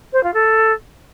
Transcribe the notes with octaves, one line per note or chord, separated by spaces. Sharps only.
C5
F4
A4